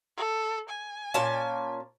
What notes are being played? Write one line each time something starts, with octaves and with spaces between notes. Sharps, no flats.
A4
G#5
A#2 C#4 A5